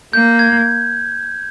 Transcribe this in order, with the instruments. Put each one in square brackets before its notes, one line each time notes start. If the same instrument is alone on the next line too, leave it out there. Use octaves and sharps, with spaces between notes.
[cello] A#3 [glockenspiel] G6
[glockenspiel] G#6